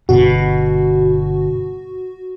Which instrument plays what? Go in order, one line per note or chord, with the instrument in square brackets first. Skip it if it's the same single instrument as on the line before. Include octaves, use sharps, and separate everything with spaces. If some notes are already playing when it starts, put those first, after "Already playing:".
[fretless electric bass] G1 B2 [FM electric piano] F#4